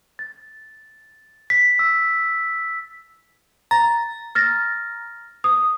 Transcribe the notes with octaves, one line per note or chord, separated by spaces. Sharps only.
A6
B6
E6
A#5 A6
F6 A6 A#6
D#6